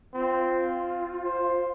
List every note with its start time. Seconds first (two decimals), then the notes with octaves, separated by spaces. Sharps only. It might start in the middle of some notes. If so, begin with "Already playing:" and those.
0.14 C4 F4
1.24 C5